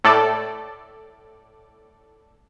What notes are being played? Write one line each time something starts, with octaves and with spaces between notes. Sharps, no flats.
A2 A4 D5